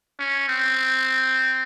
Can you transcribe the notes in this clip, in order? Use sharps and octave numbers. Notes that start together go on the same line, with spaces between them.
C#4
C4